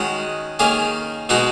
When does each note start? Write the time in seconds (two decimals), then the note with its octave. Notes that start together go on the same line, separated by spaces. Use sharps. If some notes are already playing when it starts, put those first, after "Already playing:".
Already playing: D#3 G#3 C#4 F#4
0.59 D#3 A#3 C#4 G#4
1.29 B2 G#3 D#4 F#4